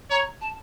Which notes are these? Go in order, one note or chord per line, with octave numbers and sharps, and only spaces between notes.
C#5 A#5
A5